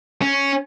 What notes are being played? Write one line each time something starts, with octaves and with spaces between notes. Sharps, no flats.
C#4